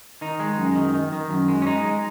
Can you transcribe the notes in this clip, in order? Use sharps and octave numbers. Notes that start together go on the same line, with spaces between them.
D#3 D#4
G#3
F#2
D#3
D#3
D#3
F#2
G#3
C#4
G#3 D#4
G#3